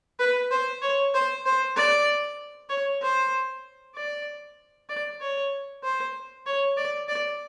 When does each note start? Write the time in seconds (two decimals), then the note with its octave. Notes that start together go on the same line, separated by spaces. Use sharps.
0.19 B4
0.51 C5
0.82 C#5
1.14 C5
1.46 C5
1.77 D5
2.70 C#5
3.02 C5
3.96 D5
4.89 D5
5.21 C#5
5.84 C5
6.46 C#5
6.77 D5
7.08 D5